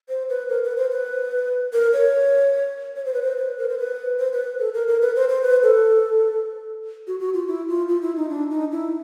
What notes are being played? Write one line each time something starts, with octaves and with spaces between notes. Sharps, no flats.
C5
B4
A#4
B4
C5
B4
A#4
C#5
C#5
C5
B4
C5
B4
A#4
C5
B4
C5
B4
A4
A#4
A#4
B4
C5
C5
B4
A4
F#4
F#4
F4
E4
F4
F4
E4
D#4
D4
D#4
E4